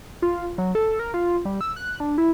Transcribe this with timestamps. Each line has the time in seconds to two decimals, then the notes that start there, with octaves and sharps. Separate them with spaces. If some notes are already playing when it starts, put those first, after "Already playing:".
0.22 F4
0.58 F#3
0.75 A4
0.99 A#4
1.14 F4
1.45 G3
1.61 E6
1.76 F#6
2.00 D4
2.18 E4